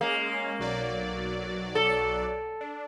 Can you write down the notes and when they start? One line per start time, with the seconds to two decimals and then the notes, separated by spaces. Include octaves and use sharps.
0.01 G#3 A#3 C#4
0.59 B1 F#3 D5
1.75 A4
2.61 D4